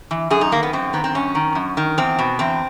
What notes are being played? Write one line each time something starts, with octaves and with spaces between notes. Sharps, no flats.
E3
F#2 G#4
D#4
D#3 A#3
B3
F#2 C4
D#3 B3
C4
F#2 C#4
D#3
F#2
D#3
E2 C4
B2
E2 C4